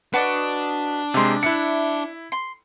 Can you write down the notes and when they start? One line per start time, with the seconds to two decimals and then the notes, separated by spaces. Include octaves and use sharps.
0.14 D4 F#4 B4 D5 D#5
1.14 C3 G#3 D#4 C6
1.43 E4 E5 F#6 C#7
2.32 C6